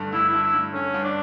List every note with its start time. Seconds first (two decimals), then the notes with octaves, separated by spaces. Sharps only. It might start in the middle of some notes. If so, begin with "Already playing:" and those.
Already playing: G2 D3 A3
0.12 G2 E4
0.29 G2 E4
0.44 E4
0.54 G2
0.73 D3 C#4
0.94 G2
1.04 D4